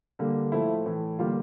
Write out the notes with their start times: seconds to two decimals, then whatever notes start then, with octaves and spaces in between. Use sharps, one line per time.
0.19 D3 G3 A#3
0.52 A2 F3 A3 E4
0.86 A2 E3 A3
1.19 D3 G3 A#3 F4